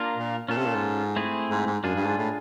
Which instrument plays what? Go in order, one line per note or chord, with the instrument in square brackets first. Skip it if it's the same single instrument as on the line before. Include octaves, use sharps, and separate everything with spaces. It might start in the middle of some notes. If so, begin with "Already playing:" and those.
Already playing: [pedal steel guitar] A#3 D4 F4 A#4
[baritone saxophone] A#2
[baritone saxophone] A#2 [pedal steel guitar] C#4 F4 A4
[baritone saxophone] C3
A#2
G#2
[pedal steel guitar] A3 C4 E4 G#4
[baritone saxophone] G#2
G#2
[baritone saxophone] F#2 [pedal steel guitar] D4 F4 G#4
[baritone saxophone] G2
G#2
A2